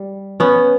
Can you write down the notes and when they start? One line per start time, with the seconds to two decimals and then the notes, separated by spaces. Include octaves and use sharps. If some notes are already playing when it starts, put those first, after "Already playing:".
Already playing: G3
0.40 B3 C#4